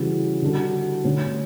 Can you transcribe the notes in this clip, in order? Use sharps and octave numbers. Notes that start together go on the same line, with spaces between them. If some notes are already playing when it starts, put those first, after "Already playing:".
Already playing: C#3 E3 G3 C#4 F#4
D3 G3 D4 F#4 A4
D3 A3 C#4